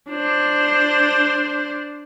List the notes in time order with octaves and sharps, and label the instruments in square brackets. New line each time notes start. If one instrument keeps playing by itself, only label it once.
[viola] D4 C5